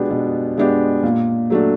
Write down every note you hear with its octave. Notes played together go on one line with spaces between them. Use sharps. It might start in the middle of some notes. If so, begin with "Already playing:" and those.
Already playing: B2 G#3 B3 D4 G4
B2
G#3 B3 D4 G4
A#2
F#3 A3 D4